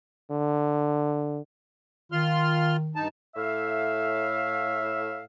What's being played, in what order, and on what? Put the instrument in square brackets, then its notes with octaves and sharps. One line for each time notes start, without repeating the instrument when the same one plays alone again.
[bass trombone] D3
[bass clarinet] D#3 [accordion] F4 C6 F6
[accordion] G2 D#4 A5
[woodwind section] A2 E5 F5